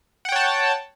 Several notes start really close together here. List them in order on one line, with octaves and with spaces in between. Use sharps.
F#5 G5 C#5 A5